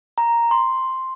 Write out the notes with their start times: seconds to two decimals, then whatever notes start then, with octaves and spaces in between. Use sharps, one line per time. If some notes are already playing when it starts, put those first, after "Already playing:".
0.18 A#5
0.51 C6